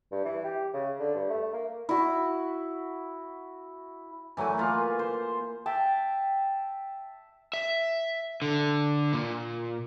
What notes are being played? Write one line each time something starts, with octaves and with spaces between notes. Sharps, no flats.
G2
E3
G4
C#3
D3
G2
A3
A#3
E4 F#4
E3 F#3 A3 G#5
A#3 F4 B4
C5
E5 G5 A5
E5
D3
A#2